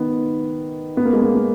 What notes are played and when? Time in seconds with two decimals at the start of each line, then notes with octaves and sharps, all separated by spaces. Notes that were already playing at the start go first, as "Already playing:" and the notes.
Already playing: D#3 B3
0.97 B3
1.05 A#3
1.13 G#3
1.22 A#3
1.35 A#3